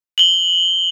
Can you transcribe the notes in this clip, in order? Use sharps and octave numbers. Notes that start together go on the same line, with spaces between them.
F#7 G7